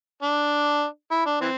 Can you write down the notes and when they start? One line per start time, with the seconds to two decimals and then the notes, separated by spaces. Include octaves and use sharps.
0.23 D4
1.11 E4
1.26 D4
1.41 E3 C4